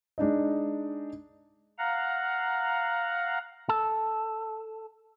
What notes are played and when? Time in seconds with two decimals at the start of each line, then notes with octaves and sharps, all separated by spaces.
0.18 G#3 D4 D#4 D#5
1.79 F5 F#5 A#5
3.69 A4